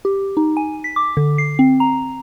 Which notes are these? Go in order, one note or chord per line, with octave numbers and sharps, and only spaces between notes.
G4
D#4
G#5
B6
D6
D3
C7
C4
A#5